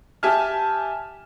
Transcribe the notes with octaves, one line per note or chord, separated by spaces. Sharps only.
G4 E5 G#5 A5 F6